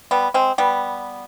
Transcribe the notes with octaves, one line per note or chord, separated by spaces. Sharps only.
G3 B3
G#3 C4
G3 B3